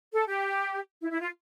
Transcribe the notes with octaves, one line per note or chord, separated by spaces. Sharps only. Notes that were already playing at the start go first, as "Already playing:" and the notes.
A4
G4
E4
E4
F4